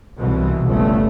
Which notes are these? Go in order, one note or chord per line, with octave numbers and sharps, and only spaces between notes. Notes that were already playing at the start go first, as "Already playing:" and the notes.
C2 B2 E3
G1 C#2 A3